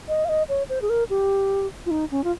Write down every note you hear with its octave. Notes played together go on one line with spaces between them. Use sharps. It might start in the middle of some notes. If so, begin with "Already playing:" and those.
D#5
F5
D#5
C#5
C5
G#4
A#4
G4
F4
D#4
C#4
F4